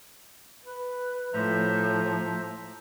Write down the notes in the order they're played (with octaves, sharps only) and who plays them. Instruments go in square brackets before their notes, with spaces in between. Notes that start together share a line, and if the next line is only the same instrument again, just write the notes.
[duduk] B4
[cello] A2 [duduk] F3 [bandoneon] C5 E5 A#5